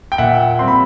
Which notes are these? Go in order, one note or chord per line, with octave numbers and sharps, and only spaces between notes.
G5
A#2 E5 F#5
G3 C4 C6
B5